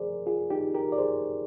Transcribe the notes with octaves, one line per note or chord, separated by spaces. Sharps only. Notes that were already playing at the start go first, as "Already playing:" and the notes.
Already playing: F2 C3 F3 G#4 A#4 C5 D5
F4 G#4
D#4 G4
G4 A#4
D5
G#4 C5